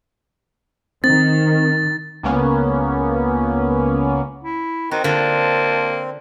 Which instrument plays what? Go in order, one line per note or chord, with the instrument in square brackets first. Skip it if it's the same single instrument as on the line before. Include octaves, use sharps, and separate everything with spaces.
[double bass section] D#3 [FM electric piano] C4 [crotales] A6
[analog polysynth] C#2 A#3 B3 C#4
[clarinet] E4
[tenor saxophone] D#3 [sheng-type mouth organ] C4 [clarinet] D#4 [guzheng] F#4
[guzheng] D3 F4 [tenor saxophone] A#3 [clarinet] A5